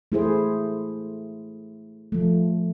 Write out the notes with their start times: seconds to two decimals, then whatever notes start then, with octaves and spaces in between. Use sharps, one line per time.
0.12 A3 E4 G#4 C5
2.12 F3 A3